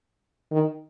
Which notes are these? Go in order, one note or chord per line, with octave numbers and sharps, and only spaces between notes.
D#3